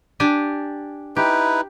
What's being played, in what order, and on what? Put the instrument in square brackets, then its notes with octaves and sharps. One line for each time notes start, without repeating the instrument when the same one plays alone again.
[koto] D4 G4 G#5
[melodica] D#4 E4 B4 [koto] G4